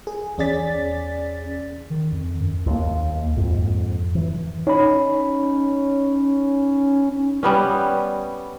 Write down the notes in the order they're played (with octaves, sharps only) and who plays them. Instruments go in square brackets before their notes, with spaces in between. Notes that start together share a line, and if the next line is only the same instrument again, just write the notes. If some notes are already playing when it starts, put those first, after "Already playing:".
[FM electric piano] G#4
E2 C#4 G#4 D5 A6 B6
[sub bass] D#3
F2
F#2
[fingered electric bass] D#2 A#3
F2 G#2
E3
[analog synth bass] C#4 [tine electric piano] D#4 C#5 B5
[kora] G3 B3 C#4